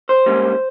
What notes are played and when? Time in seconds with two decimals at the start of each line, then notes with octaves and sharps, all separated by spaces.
0.09 C5
0.26 G#2 G3 A#3 C#4